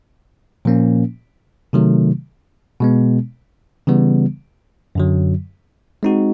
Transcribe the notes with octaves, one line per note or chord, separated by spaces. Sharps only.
A#2 F3 A#3 C#4
C3 D#3 F#3 A3
B2 G#3 B3
C#3 E3 G3 B3
F#2 D3 F#3
G#3 C4 D#4 F#4